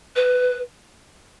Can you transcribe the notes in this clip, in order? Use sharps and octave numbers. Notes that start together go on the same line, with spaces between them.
B4